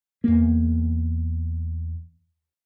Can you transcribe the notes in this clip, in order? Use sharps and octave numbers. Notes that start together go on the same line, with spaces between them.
E2 A#3